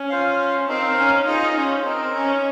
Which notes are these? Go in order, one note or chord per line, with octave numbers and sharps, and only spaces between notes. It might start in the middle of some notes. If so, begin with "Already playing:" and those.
Already playing: C#4
F4 C5 F5
C4 D#4 A#4 F5
C#4
D#4 F4 G#4 C5
C#4
C4 D#4 A#4 D#5
C#4